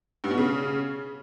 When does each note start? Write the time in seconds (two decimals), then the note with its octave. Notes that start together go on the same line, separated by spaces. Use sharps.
0.24 G2
0.31 B2
0.38 C#3